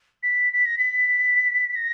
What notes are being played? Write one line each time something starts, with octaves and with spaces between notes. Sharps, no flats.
B6
B6
A#6
B6
A#6